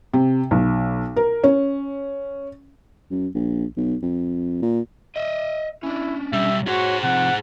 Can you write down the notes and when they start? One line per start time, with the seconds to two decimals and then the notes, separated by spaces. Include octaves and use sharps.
0.13 C3
0.51 B1
1.16 A#4
1.44 C#4
3.11 F#2
3.35 A#1
3.77 B1
4.02 F2
4.62 A#2
5.16 D#5 E5
5.83 C#4 D4 E4
6.33 B1 G3 E5
6.68 F#4 G#4 C5 C#5
7.03 C3 F3 F#5